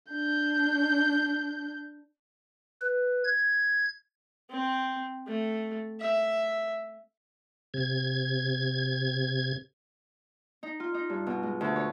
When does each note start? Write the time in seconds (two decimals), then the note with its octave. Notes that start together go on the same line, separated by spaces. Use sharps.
0.12 D4 G6
2.82 B4
3.24 G#6
4.49 C4
5.27 A3
6.00 E5
7.74 C3 G#6
10.63 D#4
10.80 F4
10.94 D#4
11.10 G2
11.27 B2
11.43 G#3
11.61 D2
11.76 C#5